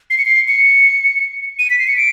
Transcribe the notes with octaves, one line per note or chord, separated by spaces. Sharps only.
C7
C#7
C7
C#7
D#7
B6
C7
C#7
D7